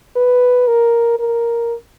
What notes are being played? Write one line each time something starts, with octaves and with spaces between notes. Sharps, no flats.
B4
A#4
A#4